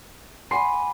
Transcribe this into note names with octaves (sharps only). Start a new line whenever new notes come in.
F#5 G#5 B5 C6 D6 C7